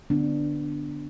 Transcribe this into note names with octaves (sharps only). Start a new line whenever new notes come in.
D3 B3 D4